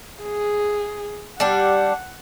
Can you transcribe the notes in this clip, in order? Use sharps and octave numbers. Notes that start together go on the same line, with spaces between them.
G#4
G3 D4 F#5